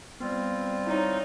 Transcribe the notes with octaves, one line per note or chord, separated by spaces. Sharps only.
G3 B3 C4 F4
D#4 E4 C#5